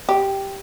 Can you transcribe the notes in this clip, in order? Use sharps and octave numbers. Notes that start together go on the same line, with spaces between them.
G4